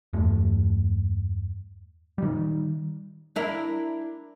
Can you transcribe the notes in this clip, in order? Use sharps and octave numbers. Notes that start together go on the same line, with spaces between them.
E2 G2 A3
D#3 G3
D4 E4 A#4